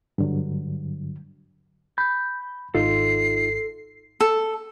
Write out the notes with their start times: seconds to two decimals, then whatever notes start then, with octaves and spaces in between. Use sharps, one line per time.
0.18 G2 D3 F#3
1.98 B5 G6
2.75 G#1 D#4 F4 A4 C6 C7
4.21 A4